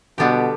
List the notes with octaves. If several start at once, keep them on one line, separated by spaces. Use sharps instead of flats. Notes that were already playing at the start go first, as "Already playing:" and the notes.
B2 D3 G3 B3 D4 G4